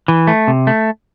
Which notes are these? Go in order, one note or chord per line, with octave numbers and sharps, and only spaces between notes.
E3
A3
C3
A3